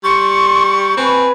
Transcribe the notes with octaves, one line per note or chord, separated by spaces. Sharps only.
G3 C6 C#6
C4 B4 G#5